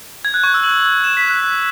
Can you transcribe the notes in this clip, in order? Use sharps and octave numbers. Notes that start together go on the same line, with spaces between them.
G#6
F#6
C#6
E6
F#7
E7
B6
F#6